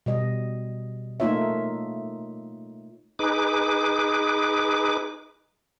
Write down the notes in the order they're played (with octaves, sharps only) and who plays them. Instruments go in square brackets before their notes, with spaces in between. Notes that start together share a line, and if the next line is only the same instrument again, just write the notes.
[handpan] B2 G3 D#5
A3 A#3 D#4 F4 C#5 E5
[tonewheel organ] D#4 G#4 B4 D6